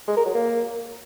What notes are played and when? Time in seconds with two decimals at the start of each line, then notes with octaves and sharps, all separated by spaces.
0.08 G#3
0.17 A#4
0.26 F#3
0.35 A#3